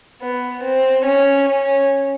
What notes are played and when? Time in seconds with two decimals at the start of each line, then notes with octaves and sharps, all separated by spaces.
0.21 B3
0.63 C4
1.05 C#4
1.48 C#4